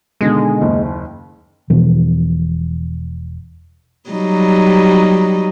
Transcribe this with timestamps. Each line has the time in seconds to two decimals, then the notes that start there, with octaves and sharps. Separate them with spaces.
0.21 B2 D3 D#3 G#3
0.61 F#1 D#2
1.70 E1 B2 E3 F3
4.10 F#3 G3 D#4